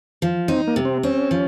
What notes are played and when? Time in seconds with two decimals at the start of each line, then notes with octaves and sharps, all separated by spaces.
0.22 F3
0.48 C4 D#4
0.67 A#3
0.76 C3
0.85 C4
1.03 C4 C#4
1.31 F3